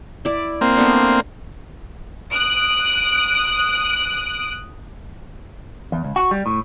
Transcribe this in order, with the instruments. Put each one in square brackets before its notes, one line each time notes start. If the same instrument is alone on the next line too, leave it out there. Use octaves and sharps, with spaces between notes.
[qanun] E4 D5
[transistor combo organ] A#3 C4
[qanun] A3 B3 D4
[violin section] D#6 F#6 D7
[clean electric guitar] E2
C#2
F#4
G3
A2